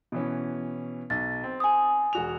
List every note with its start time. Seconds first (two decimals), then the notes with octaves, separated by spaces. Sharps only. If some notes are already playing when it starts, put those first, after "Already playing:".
0.12 B2 E3 C#4
1.10 B1 A6
1.44 C4
1.60 G#5 D#6
2.13 E1 F#4 F7